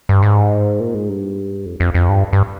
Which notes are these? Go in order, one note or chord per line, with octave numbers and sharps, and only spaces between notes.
G2
G#2
A#2
G#2
G2
F2
F2
F2
G2
G2